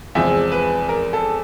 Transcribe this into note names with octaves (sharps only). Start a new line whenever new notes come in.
E2 C3 F3 G#3 E5
B4
A#4
A4